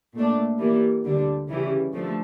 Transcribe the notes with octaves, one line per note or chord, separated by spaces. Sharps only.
A#2 A3 D4
E3 G3 A#3
D2 D3 G3 D4
C#3 E3 G3
D3 F3 A3